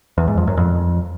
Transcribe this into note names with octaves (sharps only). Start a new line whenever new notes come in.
E2
G#2
F2
F#2
F2